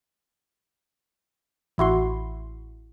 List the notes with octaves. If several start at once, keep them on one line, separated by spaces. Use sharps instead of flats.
A1 E4 F#4 C6